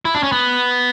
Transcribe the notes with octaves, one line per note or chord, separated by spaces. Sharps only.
E4
D4
C#4
B3